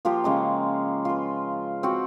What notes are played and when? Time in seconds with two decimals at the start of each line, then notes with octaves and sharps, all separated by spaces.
0.05 F3 A#3 F4 G4
0.24 C#3 G#3 A#5
1.05 F4 B4
1.83 C4 F#4 F#5